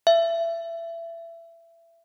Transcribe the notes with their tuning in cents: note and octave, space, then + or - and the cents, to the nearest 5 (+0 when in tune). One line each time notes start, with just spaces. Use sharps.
E5 +25